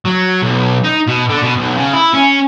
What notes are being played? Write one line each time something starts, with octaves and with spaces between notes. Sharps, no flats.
F#3
B1
D#4
B2
D3
B2
B1
C#3
E4
C#4